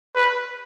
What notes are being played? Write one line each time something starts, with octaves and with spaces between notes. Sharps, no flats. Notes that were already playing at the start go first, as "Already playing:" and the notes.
B4